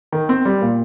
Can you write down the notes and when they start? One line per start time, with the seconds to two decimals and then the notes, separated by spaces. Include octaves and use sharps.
0.12 D#3
0.29 C4
0.45 G3
0.62 A#2